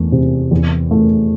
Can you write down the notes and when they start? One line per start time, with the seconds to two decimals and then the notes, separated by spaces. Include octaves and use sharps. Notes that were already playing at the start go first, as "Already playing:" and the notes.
Already playing: E2 A3
0.12 C3
0.51 E2
0.91 A3